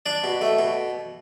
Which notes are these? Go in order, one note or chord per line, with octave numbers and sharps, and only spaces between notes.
D4 D5
B2
A3
B2